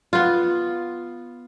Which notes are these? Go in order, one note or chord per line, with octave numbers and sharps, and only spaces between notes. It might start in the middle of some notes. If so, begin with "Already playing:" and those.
B3 F4